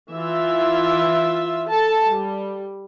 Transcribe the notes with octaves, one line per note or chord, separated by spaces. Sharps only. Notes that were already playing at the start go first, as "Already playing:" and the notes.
E3 F4 E5
A4 A5
G3